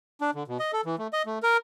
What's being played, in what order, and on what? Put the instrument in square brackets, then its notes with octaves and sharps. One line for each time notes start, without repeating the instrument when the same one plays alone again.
[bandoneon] D4
D3
B2
D#5
A4
E3
A3
D#5
A3
A#4